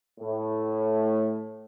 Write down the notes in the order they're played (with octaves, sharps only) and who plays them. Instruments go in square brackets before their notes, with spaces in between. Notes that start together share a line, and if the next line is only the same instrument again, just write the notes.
[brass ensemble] A2